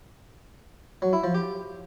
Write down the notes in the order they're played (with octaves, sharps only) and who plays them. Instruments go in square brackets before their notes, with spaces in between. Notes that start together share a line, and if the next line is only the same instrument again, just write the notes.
[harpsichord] F#3
E4
F3
G4